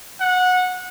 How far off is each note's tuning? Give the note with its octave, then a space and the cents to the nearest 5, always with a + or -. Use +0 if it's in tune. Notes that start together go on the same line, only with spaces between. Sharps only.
F#5 -20